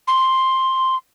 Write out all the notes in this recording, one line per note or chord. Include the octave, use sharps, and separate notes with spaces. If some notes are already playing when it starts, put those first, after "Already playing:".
C6